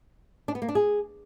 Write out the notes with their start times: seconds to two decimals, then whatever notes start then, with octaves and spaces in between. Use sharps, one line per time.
0.48 D4
0.55 B3
0.62 A#3
0.69 D4
0.75 G#4